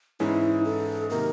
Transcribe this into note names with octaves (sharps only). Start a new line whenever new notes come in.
G#2 E3 G#3 C#4 E4
A4
C3 D#3 F#3 A#3 A#4